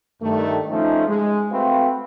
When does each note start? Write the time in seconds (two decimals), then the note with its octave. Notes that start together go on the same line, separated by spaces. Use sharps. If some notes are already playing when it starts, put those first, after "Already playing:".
0.22 G2 D#3 A3
0.70 F3 A3 C#4 D#4
1.08 G#3
1.51 A3 C4 F#4 B4 C5 F5